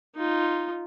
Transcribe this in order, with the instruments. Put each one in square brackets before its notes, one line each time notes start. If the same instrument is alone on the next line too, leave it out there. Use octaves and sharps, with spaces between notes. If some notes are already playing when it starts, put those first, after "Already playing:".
[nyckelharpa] D#4 F4